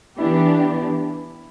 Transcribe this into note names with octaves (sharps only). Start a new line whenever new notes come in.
E3 B3 D4 E4 G4